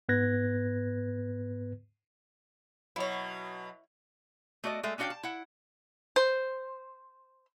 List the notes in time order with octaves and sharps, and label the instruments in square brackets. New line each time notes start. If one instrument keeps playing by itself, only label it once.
[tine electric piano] G#2 B3 B4 F#6 G#6 A#6
[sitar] B2 F#3 [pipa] E4 C#5
[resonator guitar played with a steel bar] A3 F#4 D5 D#5
G#3 A3 E5
C#4 D4 F#4 D#5 F5 G5
A5
E4 F#5
[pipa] C5